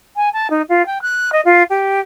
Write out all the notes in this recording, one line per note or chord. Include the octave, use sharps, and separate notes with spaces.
G#5
A5
D#4
F4
G5
F#6
D#5
F4
G4